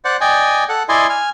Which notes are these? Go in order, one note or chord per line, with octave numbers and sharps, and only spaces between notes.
C5 D5 F#5
D5 D#5 G5 G#5
A4 F#5
E4 D5 D#5 G#5 C6
G#5 F6